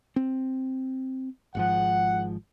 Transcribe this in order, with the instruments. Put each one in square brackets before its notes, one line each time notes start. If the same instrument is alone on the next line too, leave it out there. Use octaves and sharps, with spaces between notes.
[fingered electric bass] C4
[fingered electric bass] G#1 G#2 F3 [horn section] F#5